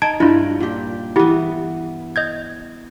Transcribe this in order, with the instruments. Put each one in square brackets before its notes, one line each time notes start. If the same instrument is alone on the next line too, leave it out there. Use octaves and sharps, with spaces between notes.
[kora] D#4 [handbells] A5 G#6 D7
[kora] G2 G3 [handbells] E4 F4
[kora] A#2 G4
[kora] E3 B3 [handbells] E4 G4
[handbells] D#5 G6 G#6